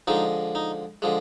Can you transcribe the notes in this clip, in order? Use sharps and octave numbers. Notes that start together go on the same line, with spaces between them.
D3 F3 G#3 D#4
D#4
D3 F3 G#3